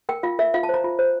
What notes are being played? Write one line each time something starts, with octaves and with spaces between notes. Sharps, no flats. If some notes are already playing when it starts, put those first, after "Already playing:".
A#4 G5
F4 F5
A#4 E5
F4 F5
A5
C5 A#5
F4
C5